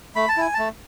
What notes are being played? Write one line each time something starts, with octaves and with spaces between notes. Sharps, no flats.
A3 B5
A5
E4 G#5
A5
A3